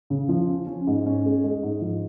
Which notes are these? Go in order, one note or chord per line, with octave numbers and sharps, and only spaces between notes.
C#3
F3
C#4
C#4
G#2
C#4
G#3
G#3
G#2
F3